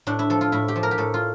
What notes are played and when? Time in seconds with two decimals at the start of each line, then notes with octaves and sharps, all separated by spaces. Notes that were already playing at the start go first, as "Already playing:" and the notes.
0.07 A2 D4
0.19 E4
0.30 F3 A4
0.41 F4
0.52 A2 E4
0.68 G4
0.76 F3
0.83 A#4
0.91 G4
0.98 A2 A4
1.14 F4